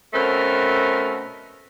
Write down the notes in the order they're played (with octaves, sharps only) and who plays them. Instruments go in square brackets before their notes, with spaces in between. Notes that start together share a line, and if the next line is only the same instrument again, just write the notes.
[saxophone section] B2 A3 C4 C#4 A#4